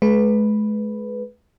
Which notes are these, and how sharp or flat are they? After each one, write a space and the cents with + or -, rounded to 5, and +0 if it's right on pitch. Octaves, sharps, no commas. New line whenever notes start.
G#3 +40 B4 +0